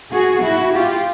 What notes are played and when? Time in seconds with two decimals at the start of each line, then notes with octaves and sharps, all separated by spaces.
0.11 F#4 G#4
0.42 E4 F#4
0.74 F4 G4